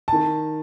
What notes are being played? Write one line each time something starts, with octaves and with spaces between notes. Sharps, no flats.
D#3 A5